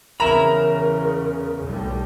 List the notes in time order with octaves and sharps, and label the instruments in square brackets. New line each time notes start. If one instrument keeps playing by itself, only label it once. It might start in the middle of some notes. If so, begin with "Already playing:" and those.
[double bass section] E2 C#3 [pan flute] A#4 [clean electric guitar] E5 B5 [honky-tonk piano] A#5
[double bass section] B1 A2 G3